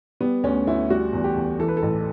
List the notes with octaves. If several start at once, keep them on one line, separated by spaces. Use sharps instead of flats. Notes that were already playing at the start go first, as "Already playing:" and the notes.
G3 B3
D2 C#4
D2 E4
G3 F#4
E2
G4
E2
E3 A4
B4
A4
A1